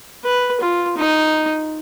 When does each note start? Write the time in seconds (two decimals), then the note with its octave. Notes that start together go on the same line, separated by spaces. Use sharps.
0.24 B4
0.60 F4
0.97 D#4